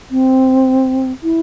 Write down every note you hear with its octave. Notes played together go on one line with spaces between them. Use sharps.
C4
E4